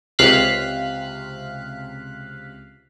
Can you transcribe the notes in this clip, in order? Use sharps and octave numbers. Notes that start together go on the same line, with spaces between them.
C#2 C3 F5 F#6 B6